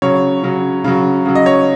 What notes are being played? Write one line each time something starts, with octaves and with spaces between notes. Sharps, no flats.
C#3 F#3 C#5
C#3 F#3
C#3 F#3
C#3 F#3
D#5
C#5